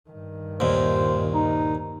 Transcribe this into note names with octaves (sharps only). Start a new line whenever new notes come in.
G2 D#3
D#2 A#2 C5
D#4